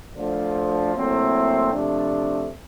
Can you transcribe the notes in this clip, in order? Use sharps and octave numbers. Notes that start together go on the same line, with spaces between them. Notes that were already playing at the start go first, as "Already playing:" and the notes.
D2 D3 F3
A#2 F#3 A3 C4 E4
C3 F3 A3 D4